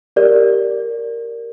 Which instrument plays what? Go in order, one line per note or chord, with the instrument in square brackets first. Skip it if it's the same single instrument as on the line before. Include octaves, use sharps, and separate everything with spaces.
[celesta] G4 A#4 D5